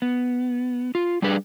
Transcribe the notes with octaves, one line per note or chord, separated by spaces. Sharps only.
B3
F4
G3 D4 G#4 B4